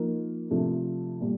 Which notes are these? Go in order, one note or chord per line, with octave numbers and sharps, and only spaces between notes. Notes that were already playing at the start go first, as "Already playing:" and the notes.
Already playing: F3 A#3 D#4
C3 F3 A3 D4
A#2 G3